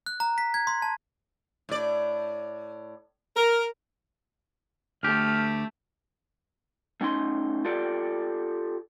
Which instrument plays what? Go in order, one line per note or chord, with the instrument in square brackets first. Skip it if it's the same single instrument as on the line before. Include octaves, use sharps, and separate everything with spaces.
[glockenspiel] F#6
A#5
B6
G#6
C6
A5
[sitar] A2 D5
[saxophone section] A#4
[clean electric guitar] D2 G4 [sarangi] A3 [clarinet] F6
[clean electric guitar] A3 C#4 D#4 C6
F4 G4 A4 D5